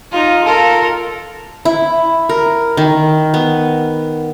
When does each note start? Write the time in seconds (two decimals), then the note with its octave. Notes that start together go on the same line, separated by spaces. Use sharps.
0.11 D#4 F4
0.45 F4 A4 A#4
1.65 E4
2.29 A#4
2.77 D#3
3.34 B3